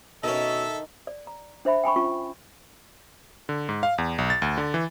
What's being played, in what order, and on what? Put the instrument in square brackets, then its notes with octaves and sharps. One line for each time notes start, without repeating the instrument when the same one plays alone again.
[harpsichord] B2 C#4 [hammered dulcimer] D#3 [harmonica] A4 E5 [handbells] D#5
[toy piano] D5
A#5
D4 C5 E5 B5
G5 G#5 B5 C#6
C#4 F4 C#6
[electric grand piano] D3
G#2
F5
E2
B1
A6
D2
D3
E3